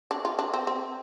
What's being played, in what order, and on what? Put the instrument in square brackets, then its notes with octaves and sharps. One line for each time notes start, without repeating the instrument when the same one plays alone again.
[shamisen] D4
F4
D4
C4
C4